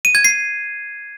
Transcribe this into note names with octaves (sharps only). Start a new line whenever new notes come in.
D#7
G#6
C7